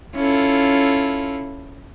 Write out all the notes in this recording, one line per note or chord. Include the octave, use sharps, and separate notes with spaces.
C#4 E4 F4 A4